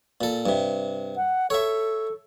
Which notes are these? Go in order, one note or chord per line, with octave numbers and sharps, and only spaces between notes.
A#2 A4
G2 C3
F#5
A4 C#5 E5